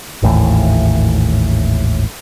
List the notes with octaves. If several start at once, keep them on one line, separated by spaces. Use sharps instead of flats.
G#1 D#2 A2 E3